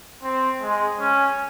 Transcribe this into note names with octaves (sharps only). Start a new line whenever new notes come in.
C4
G#3
C#4